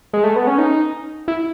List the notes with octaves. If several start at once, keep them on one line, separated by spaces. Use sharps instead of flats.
G#3
A3
B3
C#4
D#4
E4